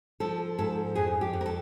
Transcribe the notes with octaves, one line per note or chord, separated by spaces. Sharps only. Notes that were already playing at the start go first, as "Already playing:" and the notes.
F3 A4
G#2 A4
F2 G#4
G4
F2
A#4
A4